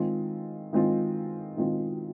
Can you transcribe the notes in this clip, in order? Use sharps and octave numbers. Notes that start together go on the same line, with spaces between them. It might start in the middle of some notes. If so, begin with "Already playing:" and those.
Already playing: D#3 G#3 C4 F4
D#3 G#3 C4 F4
D#3 G#3 C4 F4